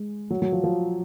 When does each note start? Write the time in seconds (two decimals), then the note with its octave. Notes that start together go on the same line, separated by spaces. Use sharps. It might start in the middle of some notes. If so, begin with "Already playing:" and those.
Already playing: G#3
0.31 F#3
0.42 F#3
0.52 F3
0.64 F3